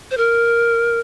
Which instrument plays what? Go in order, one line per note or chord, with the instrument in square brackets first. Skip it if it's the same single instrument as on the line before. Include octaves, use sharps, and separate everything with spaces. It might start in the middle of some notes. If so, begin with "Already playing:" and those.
[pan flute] C5
A#4